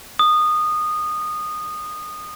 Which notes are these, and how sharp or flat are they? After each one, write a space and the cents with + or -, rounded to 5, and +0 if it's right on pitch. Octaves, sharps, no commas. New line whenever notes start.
D#6 -20